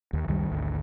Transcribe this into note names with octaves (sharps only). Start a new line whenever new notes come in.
D#2 D#3
C#2 F#2 D#3 G3
G#1 D2